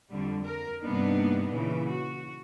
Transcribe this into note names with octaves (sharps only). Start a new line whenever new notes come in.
F2 D3 G3
A#4
G2 C3 A#3 B3 D4 D#4
A#2 C#3 E3
F#4